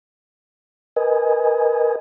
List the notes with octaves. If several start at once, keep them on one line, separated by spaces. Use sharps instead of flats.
A#4 B4 D#5 G#5